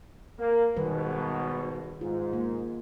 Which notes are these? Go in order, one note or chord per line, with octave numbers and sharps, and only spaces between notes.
A#3
G#1 G#2 B2 D#3 G3 B4
G#2 F4
A#3